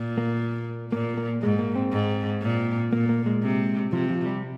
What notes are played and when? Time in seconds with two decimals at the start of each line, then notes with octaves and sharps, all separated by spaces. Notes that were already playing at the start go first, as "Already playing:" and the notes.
Already playing: A#2
0.18 A#3
0.92 A#2 A#3
1.17 A#3
1.42 G#2 G#3
1.59 A#3
1.75 C4
1.92 G#2
2.42 A#2
2.93 A#2 A#3
3.09 A#3
3.26 G#3
3.43 C3
3.92 C3 F3
4.09 F3
4.26 G3